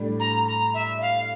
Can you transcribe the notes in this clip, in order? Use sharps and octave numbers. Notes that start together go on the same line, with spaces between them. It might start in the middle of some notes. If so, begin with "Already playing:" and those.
Already playing: A2 G3 D4
A#5
A#5
E5
F5